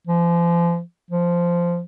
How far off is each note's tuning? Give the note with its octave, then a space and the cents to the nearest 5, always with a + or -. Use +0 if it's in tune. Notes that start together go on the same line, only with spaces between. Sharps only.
F3 -35
F3 -10